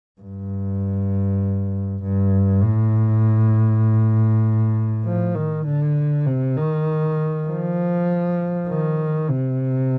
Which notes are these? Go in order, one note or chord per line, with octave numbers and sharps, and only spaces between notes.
G2
G2
A2
F3
D#3
D3
C3
D#3
F3
D#3
C3